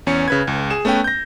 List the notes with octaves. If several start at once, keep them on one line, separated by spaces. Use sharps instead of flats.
E2 C#4 C#7
C#3 B4 G#6
C#2
G#4 E7
A3 B3 C#4 B4 G5
G6 A#6